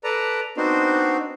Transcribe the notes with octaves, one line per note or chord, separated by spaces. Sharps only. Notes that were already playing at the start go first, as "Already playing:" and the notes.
A4 B4 D5 A#5
B3 C4 D4 D#4 F#4 C5